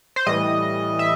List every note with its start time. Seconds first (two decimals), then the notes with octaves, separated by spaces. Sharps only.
0.16 C5
0.27 A2 E3 G3 D#5
0.99 E5